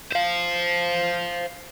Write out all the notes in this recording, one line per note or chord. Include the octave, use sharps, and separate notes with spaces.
C5 F5